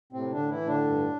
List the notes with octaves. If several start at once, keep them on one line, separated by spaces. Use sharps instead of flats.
A2 C3 C4
D3 D4
A2
E3 E4
A2
D3 D4
G2